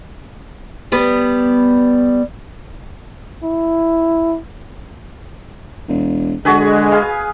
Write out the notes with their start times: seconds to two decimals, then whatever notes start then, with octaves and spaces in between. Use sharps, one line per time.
0.92 G3 B3 B4
3.44 E4
5.89 E1
6.45 D3 G#3 F#4 G#4 B4
6.92 G#4 F5